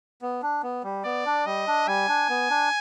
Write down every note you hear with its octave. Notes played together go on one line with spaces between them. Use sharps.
B3
D4
B3
G3
B3 D5
D4
G3 D#5
D4
G3 G#5
D4
B3
D4